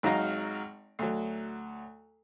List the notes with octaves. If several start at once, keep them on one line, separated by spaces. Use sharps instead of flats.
G#1 F#3 D#4 F5 A#5 F6
D2 F#3